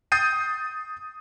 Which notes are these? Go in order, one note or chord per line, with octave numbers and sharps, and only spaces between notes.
D#6 G6 A6 C7 D#7